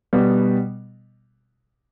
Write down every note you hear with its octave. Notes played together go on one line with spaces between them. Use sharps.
B2 G3 B3